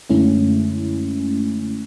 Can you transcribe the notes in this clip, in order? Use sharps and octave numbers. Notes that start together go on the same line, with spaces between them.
F#2 D3 G#3 A3 C#4 E4